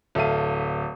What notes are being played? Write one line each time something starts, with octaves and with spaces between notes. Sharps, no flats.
D1 A4 E5 F5 D#7